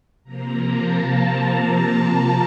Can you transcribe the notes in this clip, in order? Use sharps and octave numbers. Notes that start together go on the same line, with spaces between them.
C3 F3 A#3 A#5
A5